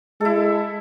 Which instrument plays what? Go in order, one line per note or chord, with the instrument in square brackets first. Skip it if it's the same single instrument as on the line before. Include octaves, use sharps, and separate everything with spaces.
[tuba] G#3 [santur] E4 A4